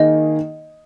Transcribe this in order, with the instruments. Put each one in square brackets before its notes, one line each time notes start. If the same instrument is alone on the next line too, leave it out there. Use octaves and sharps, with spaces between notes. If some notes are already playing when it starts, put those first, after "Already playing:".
Already playing: [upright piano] D#3 A#3 D#4 G#4 [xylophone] D#5